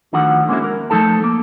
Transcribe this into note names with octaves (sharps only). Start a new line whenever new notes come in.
D2 D3 D#3 F3 F#4 F#5
G#3 A#3 C#4 D#4 E4 F#4
A#4
F3 A3 D#4 A4 A5
A#3